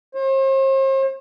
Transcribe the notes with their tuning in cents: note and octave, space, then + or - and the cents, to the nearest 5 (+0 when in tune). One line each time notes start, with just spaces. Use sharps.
C5 +40